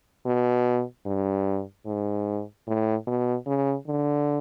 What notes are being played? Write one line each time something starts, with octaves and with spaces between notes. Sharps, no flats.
B2
G2
G#2
A2
B2
C#3
D3